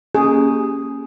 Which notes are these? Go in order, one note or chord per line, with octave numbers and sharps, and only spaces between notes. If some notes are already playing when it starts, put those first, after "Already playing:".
A#3 C#4 G4 G#4